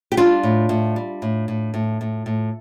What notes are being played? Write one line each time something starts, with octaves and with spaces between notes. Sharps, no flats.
G4
G3 D4 F4
A2
A2
G3
A2
A2
A2
A2
A2